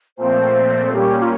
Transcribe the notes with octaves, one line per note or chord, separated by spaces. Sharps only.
A#2 F3 A3 C4 C5
A#2 G3 A#3 C#4 G4
F4